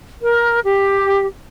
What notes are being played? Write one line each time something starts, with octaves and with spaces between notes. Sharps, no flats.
A#4
G4